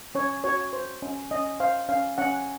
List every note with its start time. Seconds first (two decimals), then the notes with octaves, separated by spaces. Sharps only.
0.15 C#4 C#5
0.44 F#4 C#5
0.73 C5
1.02 C#4
1.31 C#4 D#5
1.60 C5 F5
1.89 C#4 F5
2.18 C#4 F#5